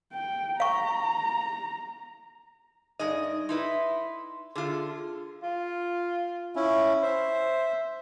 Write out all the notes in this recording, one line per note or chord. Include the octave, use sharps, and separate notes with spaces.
G5
F5 A#5 C#6
G2 D#4 G#4 D5 D#5
D#4 E4 B4 C6
D3 F4 G#4
F4
C#4 E4 E5
C5 E5